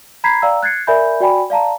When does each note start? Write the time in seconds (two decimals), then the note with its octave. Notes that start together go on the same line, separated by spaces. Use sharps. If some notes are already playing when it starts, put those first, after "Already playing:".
0.24 A#5 B5 G6 G#6 B6 C7
0.42 D5 F5 G5 A#5 E6
0.63 F#6 G#6 A6 C7 C#7
0.87 A#4 D5 E5 G#5 B5 G6
1.21 F#4 D5 G5 G#5 B5
1.50 D5 F5 A5 A#5